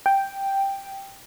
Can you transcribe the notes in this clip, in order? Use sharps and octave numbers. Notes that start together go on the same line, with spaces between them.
G5